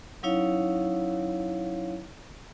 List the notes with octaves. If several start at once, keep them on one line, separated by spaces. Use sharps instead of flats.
F#3 C#4 D#4 E4 C#5 F5